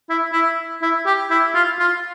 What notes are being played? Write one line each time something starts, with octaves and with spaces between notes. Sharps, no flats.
E4
E4
E4
G4
E4
F4
F4